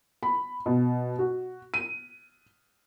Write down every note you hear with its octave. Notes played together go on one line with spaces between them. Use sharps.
B5
B2
F#4
D#7